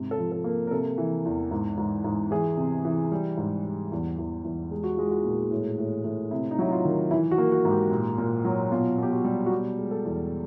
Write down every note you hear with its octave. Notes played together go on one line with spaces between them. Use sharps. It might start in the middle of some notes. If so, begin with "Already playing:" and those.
Already playing: G#2 C3
A4
F3
A4
A#3
A#4
C3 A4
E3
E2
G#2
G#2
G#2
E3 G#4
C3
E3
G3
G#2
G3
E2
E2
E2
G#3 G4
F#4
G#3 F4
F#4
A#2
A2
A2
A2
C3 E4
D#4
F#3 E4
F4
D#3
E3 E4
F#4
A#3
F#4
G#2
G4
A#2
A#2
F#3
B2 F4
B2 G4
F#4
G3
F#4
B2 G4
G#3
A4
E2